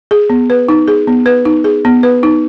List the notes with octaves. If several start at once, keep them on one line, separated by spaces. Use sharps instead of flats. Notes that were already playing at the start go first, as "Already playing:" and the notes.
G#4
B3
B4
D#4
G#4
B3
B4
D#4
G#4
B3
B4
D#4